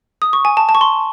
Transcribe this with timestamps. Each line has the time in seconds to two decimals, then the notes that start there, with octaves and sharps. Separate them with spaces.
0.22 D#6
0.33 C#6
0.45 G#5
0.57 A5
0.69 A5
0.75 C#6
0.81 C6